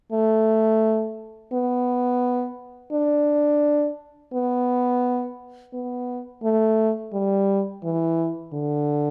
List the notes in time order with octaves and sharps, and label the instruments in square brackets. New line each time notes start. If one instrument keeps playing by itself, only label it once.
[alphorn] A3
B3
D4
B3
B3
A3
G3
E3
D3